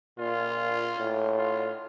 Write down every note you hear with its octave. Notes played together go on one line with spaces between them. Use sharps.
A#2 F4
A2
F4